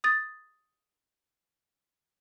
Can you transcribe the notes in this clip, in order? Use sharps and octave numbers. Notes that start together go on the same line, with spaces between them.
D#6 A6